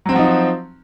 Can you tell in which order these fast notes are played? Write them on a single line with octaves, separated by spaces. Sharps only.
F#3 C4 F#4 F3 D#4